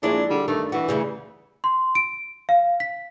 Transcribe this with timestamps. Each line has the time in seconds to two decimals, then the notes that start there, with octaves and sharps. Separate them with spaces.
0.03 A#1 G#3 D4 E4 D5
0.30 D3 G3
0.48 G2 D#3 A3
0.72 E3 F#4
0.89 D2 C#3 G3
1.64 C6
1.95 D7
2.49 F5
2.80 B6